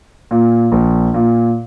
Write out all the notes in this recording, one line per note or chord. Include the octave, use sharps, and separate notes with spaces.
A#2
A#1
A#2